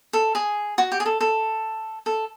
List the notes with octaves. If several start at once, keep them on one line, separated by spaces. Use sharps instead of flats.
A4
G#4
F#4
G4
G#4
A4
A4
A4